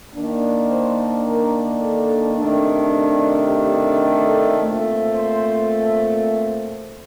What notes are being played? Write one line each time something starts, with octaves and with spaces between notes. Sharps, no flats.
D#3 A#3 D4
C5
A#4
A4
C3 D#3 A3 D4
G4
A4
A#2 A3 C4
C5